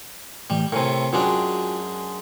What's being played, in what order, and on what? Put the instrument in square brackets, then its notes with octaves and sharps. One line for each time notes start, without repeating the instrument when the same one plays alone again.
[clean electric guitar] A2 E3 [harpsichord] G3
[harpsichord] A2 C3 [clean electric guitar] A#4 G#5
[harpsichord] F#2 G#3 D4 [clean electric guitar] F4 F#4 G5